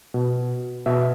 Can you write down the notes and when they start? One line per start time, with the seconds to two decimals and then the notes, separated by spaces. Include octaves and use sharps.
0.14 B2
0.86 B2 E5